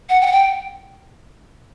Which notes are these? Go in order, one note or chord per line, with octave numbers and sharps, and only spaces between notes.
F#5
G5
F#5
G5